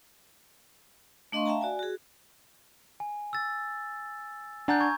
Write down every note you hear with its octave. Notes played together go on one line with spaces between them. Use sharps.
A3 D4 D#5 F5 C6 C#6
E5 F5 G5 A5 A#5
F#4 D5 G#5
F#4 G#4
G#5
E6 A6
D4 F#5 G#5 A#5 G6 A6
C#6 G#6